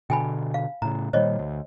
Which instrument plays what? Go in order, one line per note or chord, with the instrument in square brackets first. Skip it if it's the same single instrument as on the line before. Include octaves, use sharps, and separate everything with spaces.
[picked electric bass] B2 D3 [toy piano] G5 G#5 B5
[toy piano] F5
[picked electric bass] A2 C#3 [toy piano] A#5
[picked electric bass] A#2 D#3 G3 [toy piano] C5 C#5 D#5
[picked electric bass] D2